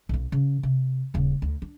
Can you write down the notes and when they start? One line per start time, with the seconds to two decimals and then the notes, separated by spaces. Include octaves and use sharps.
0.09 B1 B3
0.32 C#3
0.63 C3
1.14 D#1 C#3
1.42 D2
1.62 D4